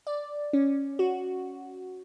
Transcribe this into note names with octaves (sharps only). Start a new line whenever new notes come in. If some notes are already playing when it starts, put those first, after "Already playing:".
D5
C#4
F#4